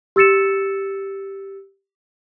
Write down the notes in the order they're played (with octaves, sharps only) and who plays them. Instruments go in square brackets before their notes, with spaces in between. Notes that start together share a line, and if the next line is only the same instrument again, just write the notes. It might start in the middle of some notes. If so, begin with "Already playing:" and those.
[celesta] G4 E6 A6 C#7 E7